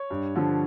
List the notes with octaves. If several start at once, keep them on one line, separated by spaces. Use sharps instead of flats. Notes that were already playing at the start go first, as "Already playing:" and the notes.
Already playing: C#5
G2
D3 F3